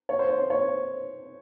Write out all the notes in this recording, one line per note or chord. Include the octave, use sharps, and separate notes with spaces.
C#5
C5
C#5
C5
C#5
C5